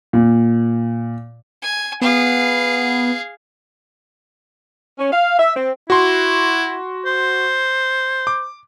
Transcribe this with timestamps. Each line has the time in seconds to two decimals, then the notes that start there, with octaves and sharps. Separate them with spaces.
0.13 A#2
1.62 G#5
2.01 B3 G#4 F5
4.99 C#4
5.11 F5
5.39 E5
5.56 C4
5.90 E4 F#4 C6
7.06 C5
8.27 D6